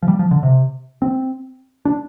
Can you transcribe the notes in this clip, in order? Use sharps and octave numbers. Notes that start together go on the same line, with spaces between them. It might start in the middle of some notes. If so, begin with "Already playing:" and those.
F3
G3
F3
D3
C3
C4
D4